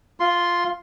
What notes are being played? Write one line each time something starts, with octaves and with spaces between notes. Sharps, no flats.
F4 C6